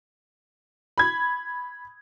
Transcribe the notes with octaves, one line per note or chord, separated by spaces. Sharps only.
B5 G#6